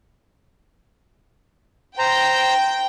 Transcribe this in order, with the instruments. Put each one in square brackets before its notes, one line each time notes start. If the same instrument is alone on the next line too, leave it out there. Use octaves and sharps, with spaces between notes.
[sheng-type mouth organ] C5 A#5 [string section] G5